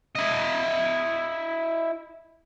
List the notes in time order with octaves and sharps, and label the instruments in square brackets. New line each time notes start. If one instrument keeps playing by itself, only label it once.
[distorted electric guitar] E4 D#5